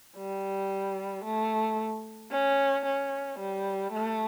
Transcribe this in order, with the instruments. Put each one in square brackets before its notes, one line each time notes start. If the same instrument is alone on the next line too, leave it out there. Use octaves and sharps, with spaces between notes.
[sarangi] G3
A3
C#4
C#4
G3
A3